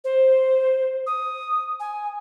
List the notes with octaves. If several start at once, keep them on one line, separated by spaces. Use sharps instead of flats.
C5
D#6
G#5